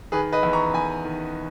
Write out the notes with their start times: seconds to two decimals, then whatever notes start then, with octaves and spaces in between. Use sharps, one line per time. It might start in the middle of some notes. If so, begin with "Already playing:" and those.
0.12 D#3 G#4 B4
0.32 B4 D#5
0.43 E2
0.53 A#5 C#6
0.74 E2 G#5 B5
1.05 D#3